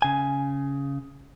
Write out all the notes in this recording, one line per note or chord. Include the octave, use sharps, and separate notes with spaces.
C#3 G#5